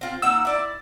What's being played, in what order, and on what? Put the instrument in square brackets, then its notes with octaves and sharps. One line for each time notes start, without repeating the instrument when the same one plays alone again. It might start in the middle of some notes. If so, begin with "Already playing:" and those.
[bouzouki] C4 F4
[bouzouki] A#3 D#4 F#5 [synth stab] E6
[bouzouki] E4 D5